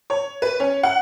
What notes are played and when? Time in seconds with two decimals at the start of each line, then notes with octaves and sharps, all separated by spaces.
0.10 C#5
0.42 B4
0.60 C#4
0.83 F#5